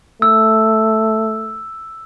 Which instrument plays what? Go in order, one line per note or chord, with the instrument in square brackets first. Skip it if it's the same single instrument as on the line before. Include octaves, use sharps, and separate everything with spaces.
[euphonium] A3 [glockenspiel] E6